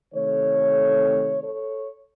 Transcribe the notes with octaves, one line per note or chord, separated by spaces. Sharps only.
C3 D#3 A3 A4 C#5
A4 C#5